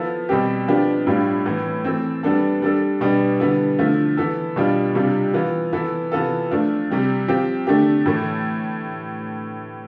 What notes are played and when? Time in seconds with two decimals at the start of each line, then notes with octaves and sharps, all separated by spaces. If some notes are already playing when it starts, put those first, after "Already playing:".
Already playing: F3 B3 E4 A4
0.29 B2 G3 C4 G4
0.68 F3 B3 D4 G4
1.07 A2 G3 D4 F4
1.46 A2 E3 B3
1.85 E3 A3 C4
2.23 G3 B3 D4 A4
2.62 G3 D4 A4
3.01 B2 G3 B3 D4
3.40 D3 G3 B3 E4 A4
3.78 D3 F3 A3 E4
4.17 E3 B3 E4 A4
4.56 B2 G3 D4 F4
4.95 C3 G3 D4 F4
5.34 E3 B3 F4
5.73 E3 B3 E4 A4
6.12 C3 E3 B3 F4 A4
6.50 F3 A3 D4 F4
6.90 C3 G3 C4
7.28 F3 C4 G4
7.67 D3 A3 D4 G4
8.06 A2 E3 A3